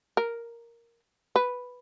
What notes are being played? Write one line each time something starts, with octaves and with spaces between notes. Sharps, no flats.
A#4
B4